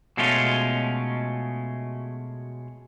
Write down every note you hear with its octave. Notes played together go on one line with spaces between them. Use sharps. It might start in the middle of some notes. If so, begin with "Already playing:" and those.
B2 G#3 A3 C#4 F4